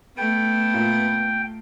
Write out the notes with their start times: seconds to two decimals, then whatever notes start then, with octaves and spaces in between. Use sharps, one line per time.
0.17 A3 B3 G5
0.74 A#2